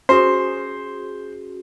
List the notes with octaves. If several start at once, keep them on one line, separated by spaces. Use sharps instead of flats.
C#4 F#4 G#4 C5